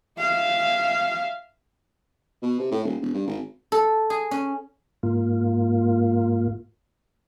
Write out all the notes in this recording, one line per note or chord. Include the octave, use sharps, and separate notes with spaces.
E5 F5
B2
C3
A2
D#1
E1
G2
G#1
A4
G#4
C#4
G#2 A#3 F4